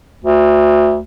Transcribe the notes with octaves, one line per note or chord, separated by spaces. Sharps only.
D2